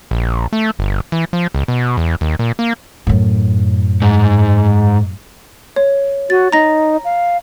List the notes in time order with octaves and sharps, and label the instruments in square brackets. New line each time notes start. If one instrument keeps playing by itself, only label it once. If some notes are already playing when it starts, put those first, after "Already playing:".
[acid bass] A#1
A3
G1
E3
F3
C#2
B2
E2
D#2
A#2
A#3
[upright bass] F#2 A2
[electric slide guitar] G#2
[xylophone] C#5
[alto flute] F#4 [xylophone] A6
[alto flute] D#4 [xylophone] A#5 A#6
[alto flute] F5